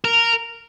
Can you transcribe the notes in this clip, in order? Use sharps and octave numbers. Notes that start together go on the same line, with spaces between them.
A#4